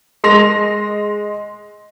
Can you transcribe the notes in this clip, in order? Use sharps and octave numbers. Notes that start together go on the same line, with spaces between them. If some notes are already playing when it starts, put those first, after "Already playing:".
G#3 C6 A#6 F7